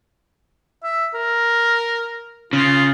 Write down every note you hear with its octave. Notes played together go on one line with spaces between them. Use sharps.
E5
A#4
C#3 F4